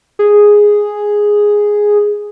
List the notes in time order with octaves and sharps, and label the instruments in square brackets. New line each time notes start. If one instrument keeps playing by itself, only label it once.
[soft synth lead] G#4